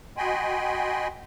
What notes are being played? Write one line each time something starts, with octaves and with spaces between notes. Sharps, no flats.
F#4 D#5 G5 G#5 B5 C6